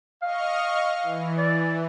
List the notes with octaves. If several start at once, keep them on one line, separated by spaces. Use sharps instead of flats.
D#5 F5 C#6 F6
E3
D5